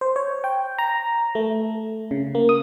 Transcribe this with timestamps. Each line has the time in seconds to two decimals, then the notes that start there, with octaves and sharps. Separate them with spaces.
0.01 C5
0.16 C#5
0.44 G5
0.78 A#5
1.35 A3
2.11 C#3
2.35 A#3
2.49 D#6